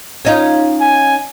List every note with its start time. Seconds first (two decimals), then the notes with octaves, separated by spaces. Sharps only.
0.25 C#4 D#4 F4
0.81 G#5